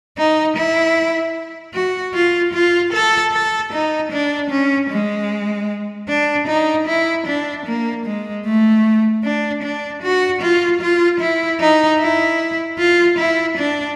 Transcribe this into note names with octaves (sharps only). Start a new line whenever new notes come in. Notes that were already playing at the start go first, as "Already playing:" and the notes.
D#4
E4
F#4
F4
F4
A4
A4
D#4
D4
C#4
G#3
D4
D#4
E4
D4
A#3
G#3
A3
D4
D4
F#4
F4
F4
E4
D#4
E4
F4
E4
D4